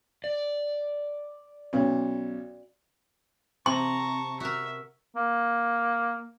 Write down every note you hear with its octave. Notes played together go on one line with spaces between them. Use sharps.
D5
B1 C#4
C3 A5 A#5 C6 C#6
F#4 A#4 E5
A#3